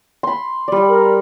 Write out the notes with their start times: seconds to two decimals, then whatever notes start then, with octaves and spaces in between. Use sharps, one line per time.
0.23 B5 C6
0.68 G3 D5
0.89 A#4